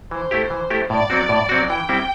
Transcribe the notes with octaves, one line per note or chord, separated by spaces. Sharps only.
E3 C5
A3 E4 G4
E3
A3 E4 G4
A2 D5
F#3 C4 F#4
A2
F#3 C4 F#4
E3 G5
G3 C4 E4